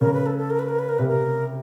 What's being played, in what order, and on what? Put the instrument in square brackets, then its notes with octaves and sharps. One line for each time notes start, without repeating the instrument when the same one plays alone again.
[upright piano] C#3 [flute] A#4
[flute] B4
A4
A4
A#4
B4
A#4
B4
A#4
[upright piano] C3 [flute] B4
[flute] A#4